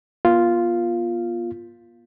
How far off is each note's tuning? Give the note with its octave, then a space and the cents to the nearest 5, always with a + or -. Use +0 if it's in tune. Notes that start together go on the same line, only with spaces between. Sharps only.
B3 -45 F4 -5